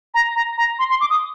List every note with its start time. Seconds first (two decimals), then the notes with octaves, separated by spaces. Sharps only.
0.14 A#5
0.36 A#5
0.57 A#5
0.79 C6
0.90 C6
1.01 D6
1.10 D#6